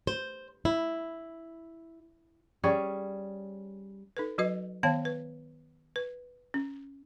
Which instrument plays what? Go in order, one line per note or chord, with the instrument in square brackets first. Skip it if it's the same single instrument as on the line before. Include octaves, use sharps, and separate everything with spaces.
[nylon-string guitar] C5
E4
[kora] G3 C#4 G#4 C#5
[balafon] D#4 A4 B4
F#3 F#4 B4 D#5
D#3 B3 C#5 F5 A5
B4
B4
C#4